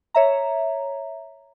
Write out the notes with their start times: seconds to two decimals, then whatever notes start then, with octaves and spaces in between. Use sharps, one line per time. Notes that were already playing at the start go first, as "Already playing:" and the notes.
0.14 C#5 E5 A#5